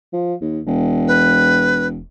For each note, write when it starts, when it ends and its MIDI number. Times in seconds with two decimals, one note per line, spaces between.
0.13 0.34 53
0.41 0.61 39
0.67 2.03 28
1.08 1.87 71